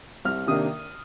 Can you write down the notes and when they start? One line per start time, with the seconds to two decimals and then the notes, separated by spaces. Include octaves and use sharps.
0.25 C2 F6
0.47 C3 D#3 A#3 D4 D#6